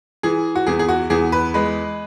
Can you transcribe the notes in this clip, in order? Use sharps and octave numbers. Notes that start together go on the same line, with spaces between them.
E3 G#4
F#4
E2 G#4
G#4
F#4
E2 G#4
B4
G#3 B4